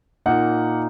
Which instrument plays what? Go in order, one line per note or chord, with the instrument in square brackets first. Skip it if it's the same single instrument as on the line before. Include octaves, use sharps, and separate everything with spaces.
[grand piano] A#2 A#3 D#4 F#5